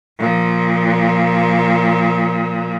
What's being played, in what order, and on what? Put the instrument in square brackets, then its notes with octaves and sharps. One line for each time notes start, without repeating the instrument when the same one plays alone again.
[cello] A#2 F3